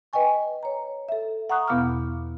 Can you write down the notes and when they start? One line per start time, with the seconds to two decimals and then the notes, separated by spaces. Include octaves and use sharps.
0.13 B4 D#5 G5 G#5 C#6
0.63 C#5 A#5
1.09 A4 E5
1.50 F#5 A#5 C#6 D#6 F#6
1.68 E2 B2 B3 F5 D6 F6